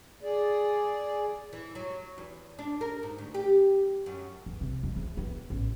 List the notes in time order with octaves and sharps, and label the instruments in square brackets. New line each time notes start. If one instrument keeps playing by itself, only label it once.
[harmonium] G#4 D5
[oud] E3
F#3
E2
D4
A#4
G#2
D2
G4
F#2
[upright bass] E2
C3
F2
E2
B3
A1